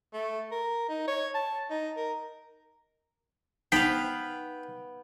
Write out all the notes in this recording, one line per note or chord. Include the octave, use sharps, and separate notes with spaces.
A3
A#4
D#4
C#5
A5
D#4
A#4
B3 D#4 F5 G5 B6